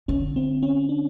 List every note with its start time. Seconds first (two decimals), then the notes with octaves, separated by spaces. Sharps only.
0.08 D3 C#4
0.36 C4
0.63 C#4
0.89 D4